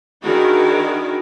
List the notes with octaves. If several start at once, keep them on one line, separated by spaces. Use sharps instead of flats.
D#3 D4 E4 F#4 G#4 A#4